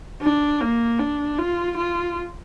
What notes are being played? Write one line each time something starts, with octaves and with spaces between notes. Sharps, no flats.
D4
A#3
D4
F4
F4